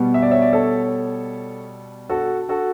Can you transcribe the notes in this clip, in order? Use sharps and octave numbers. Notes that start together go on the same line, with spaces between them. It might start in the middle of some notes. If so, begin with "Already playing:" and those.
Already playing: B2 G3 B3
E5
D5
C#5 E5
D5
A4 C#5
F#4 A4
F#4 A4